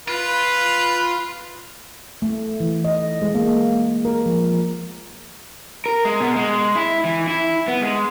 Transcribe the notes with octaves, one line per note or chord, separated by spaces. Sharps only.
F4 B4
A3
E3
D#5
G#3
A#3
A#4
F3
A#4
G#3
B2
G#3
E4
E3
E4
B3
G#3